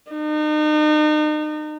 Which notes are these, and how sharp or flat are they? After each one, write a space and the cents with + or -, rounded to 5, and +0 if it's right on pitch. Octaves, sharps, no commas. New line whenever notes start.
D#4 -35